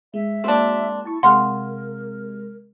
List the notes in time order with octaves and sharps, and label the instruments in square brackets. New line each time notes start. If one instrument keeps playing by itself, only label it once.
[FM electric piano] G#3 [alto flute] E5
[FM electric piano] G#3 A#3 F#4 [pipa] C4 D4
[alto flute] E4 [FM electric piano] A5 C#6
[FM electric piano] C3 G#3 [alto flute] A#4 [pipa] F5 F#5 [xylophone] C6